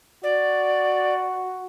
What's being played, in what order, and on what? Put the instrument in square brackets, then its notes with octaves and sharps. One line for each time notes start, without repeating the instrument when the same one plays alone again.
[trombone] F#4 [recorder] D5